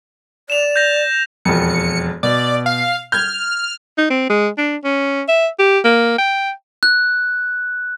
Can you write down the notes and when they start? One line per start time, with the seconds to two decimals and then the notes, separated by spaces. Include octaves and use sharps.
0.50 D5 E7 F7
0.76 G6 A#6
1.45 E1 F2 C#7
2.23 B2 D5
2.66 F5
3.12 F6 G6 G#6
3.98 D#4
4.10 C4
4.30 G#3
4.58 D4
4.84 C#4
5.28 E5
5.59 G4
5.84 A#3
6.18 G5
6.83 F#6